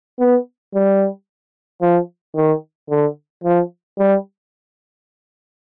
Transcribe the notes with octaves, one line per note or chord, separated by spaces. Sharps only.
B3
G3
F3
D#3
D3
F3
G3